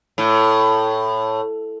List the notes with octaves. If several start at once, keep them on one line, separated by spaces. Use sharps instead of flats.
A2